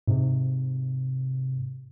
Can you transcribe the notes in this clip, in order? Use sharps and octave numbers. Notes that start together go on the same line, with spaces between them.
G#2 C3